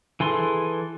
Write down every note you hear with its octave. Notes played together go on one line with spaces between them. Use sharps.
E3 G#4 A4 C6